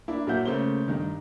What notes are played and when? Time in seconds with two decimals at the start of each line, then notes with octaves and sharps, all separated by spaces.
0.08 A#3 D4 E4
0.27 A#2 F#3 A#3 E5 F#5 G6
0.45 C#3 A3 A#3 C5 G7
0.88 G2 D#3